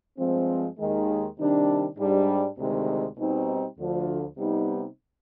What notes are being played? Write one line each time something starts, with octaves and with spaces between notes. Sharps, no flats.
G2 F3 G#3 C4
D#2 D#3 G#3
C3 D#3 G3 D4
G#2 G3 D4
D2 C3 D#3 G#3
B2 G3 C4 D#4
D2 D3 F3
C3 G3 B3 D#4